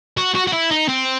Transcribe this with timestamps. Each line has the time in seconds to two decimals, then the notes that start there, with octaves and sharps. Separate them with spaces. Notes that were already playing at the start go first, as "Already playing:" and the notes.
0.17 F#4
0.35 F#4
0.47 F#4
0.53 E4
0.70 D#4
0.89 C4